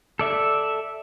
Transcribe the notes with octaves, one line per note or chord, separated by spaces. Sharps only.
A4 D5 E5